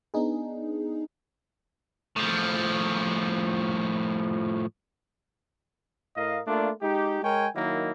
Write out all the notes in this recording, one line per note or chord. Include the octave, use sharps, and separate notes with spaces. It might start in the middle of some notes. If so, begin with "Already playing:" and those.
B3 D4 D#4 G#4
A2 F3
A2 A#4 D#5 F5
A3 A#3 D4 F4 D5
G#3 D#4 G4
G#3 A#4 C#5 G5 G#5
D#3 F#3 A#3 D#4 E4